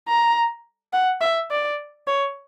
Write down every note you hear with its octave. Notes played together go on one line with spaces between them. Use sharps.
A#5
F#5
E5
D5
C#5